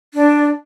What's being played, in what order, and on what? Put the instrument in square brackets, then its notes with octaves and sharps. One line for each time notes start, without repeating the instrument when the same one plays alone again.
[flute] D4